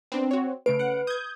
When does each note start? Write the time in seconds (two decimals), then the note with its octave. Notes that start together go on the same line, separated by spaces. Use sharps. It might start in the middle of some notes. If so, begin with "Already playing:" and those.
0.12 B3 C4 D4
0.31 F#4 C#5
0.66 C#3 A3 B4 D7
0.79 F#5
1.07 D#6 G6 G#6